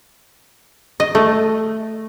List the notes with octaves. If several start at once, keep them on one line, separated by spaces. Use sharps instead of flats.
D#5
A3